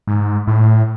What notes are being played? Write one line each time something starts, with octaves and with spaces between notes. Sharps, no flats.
G#2
A2